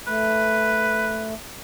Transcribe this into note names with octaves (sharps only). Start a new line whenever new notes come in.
A3 B4